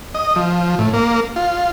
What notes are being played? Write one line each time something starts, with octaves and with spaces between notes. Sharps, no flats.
D#5
F3
A2
A#3
F4